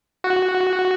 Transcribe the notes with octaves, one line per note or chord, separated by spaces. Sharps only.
F#4